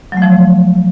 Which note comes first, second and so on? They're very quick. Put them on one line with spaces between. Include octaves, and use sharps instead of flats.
F#3 A3 F3